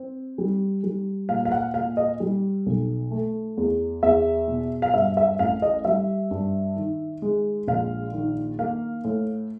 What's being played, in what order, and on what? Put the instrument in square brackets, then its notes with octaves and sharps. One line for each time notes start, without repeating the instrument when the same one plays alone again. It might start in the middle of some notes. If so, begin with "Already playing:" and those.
Already playing: [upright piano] C4
G3
G3
A#2 F5
F5
F#5
A#2 F5
D#5
G3
B1
A3
E2
E2 E5
B2
F5
G2 E5
E5
A1 F5
D#5
G3 E5
G2
D#3
G#3
A#1 F5
D#3
A#3 F5
A2